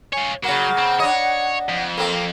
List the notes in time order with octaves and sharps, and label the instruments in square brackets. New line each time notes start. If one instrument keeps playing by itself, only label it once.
[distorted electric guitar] F4 C#5 [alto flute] G#5
[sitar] C#3 A#3 [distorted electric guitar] F#3 [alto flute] F#5
[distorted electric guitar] C4
[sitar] D4 D#5 [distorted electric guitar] C#5
[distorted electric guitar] F2
[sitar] A#3 C4 [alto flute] A4